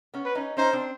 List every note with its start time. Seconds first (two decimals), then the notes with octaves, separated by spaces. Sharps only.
0.14 B3 C#4
0.25 B4
0.35 C#4 D#4
0.57 C#4 D#4 C5
0.73 C4 D4